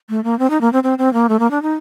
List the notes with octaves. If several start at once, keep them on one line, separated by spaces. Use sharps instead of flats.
A3
A#3
C4
D#4
A#3
C4
C4
C4
A#3
A3
A#3
D4
D#4